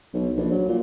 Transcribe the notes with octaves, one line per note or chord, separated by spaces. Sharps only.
B1
A#1
F#3
A#2